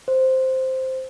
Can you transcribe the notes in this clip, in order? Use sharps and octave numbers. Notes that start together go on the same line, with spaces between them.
C5